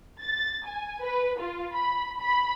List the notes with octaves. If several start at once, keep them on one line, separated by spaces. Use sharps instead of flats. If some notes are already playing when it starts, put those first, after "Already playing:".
A6
G#5
B4
F4
B5
B5